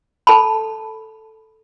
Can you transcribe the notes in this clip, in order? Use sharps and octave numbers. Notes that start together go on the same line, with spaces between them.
A4 A5 B5